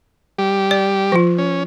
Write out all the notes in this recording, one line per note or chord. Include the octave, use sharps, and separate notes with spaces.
G3 G4
D5
F3 F4
C#4